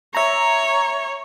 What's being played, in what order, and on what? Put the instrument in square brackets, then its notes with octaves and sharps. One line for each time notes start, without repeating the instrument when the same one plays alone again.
[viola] C#5 [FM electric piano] E5 A#5